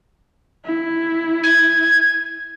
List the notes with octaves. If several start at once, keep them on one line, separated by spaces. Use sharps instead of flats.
E4
G#6